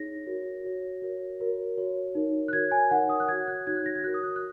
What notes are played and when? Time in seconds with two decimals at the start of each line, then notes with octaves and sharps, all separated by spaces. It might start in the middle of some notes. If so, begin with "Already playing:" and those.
Already playing: D#4 G#4 C#5 A#6
0.26 F#4 A#4 C#5
0.64 F#4 C#5
1.02 F#4 A#4 C#5
1.40 F#4 A#4 C#5
1.77 F#4 C#5
2.15 D#4 A#4 C#5
2.48 F#6
2.53 F#4 A#4 C#5 G#6
2.71 G#5
2.91 D#4 A#4 C#5 F#5
3.09 D#6
3.20 F#6
3.28 F#4 C#5 G#6
3.48 F#6
3.67 D#4 F#4 C#5 G#6
3.76 F#6
3.86 A#6
3.95 G#6
4.04 F#4 A#4 C#5 F#6
4.14 D#6
4.23 F#6
4.36 F#6